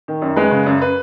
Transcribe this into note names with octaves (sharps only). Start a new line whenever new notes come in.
D#3
F#2
G#3 B4
C#3
F#2
B4